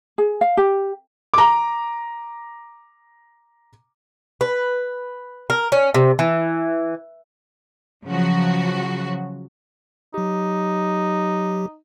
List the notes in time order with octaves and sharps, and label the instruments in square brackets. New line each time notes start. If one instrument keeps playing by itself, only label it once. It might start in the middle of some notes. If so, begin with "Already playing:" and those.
[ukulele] G#4
F5
G4
[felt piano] A#5 D6
[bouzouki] B4
A#4
C#4
C3
E3
[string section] C#3 F3 F#3 F#4
[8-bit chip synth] F#3 G4 [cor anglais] D#4